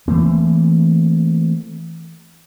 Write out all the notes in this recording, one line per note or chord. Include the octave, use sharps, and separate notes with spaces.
E3 A3 A#3 C4